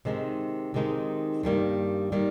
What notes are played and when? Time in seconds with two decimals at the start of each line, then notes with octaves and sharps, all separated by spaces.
0.05 C3 D#3 G#3 D#4
0.74 C3 D#3 G#3 D#4
1.43 G2 D#3 G3 A#3
2.12 D#3 G3 A#3